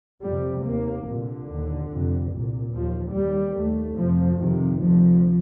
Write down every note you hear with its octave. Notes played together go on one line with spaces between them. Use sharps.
F2 C3 G3
D#2 A#3
C2 A#2 D3
D#2
F2 C3
C2 A#2
D#2 F3
D#2 G3
D#2 A3
F2 C3 F3
F2 C3 D#3
D2 C3 F3